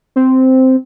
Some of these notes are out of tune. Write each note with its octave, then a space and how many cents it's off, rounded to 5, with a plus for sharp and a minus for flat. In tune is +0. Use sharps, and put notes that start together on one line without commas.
C4 -5